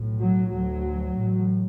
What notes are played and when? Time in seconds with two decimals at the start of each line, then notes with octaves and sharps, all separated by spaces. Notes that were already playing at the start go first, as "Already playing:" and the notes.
Already playing: B1 A2
0.20 F#3
0.52 D2 F#3
1.16 A1 A2